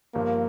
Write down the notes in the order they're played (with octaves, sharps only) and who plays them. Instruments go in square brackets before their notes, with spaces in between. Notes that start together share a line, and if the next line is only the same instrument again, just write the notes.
[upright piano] G1 G2 F3 [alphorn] A#3